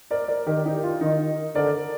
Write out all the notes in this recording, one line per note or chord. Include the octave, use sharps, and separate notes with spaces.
A#4 D5
A#4 D5
D#3 G4 A#4
D#4 G4
F4
D#3 D#4
D3 A#4 D5